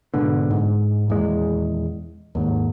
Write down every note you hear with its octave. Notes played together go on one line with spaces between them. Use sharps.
G#2 B2 D3
G#2
D#1 E2 G#3
D#2 G#2